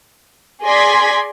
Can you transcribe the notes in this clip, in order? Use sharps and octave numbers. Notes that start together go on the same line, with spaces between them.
G#4 D5 C6 G#6 A#6 B6